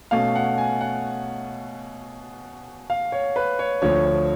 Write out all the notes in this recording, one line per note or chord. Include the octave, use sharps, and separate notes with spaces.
B2 A3 C#4 F5
F#5
G#5
F#5
F5
C#5
B4
C#5
D2 D3 F3 C#5